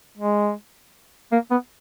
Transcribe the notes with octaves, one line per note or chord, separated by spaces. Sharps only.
G#3
A#3
B3